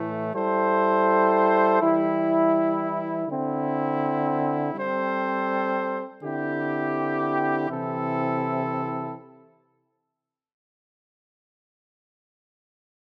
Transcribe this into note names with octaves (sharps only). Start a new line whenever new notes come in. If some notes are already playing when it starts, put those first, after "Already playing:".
Already playing: A2 E3 A3
G3 E4 A4 C5
E3 G3 E4
D3 C4 E4
G3 C4 A4 C5
D3 C4 E4 G4
C3 E3 C4 E4 A4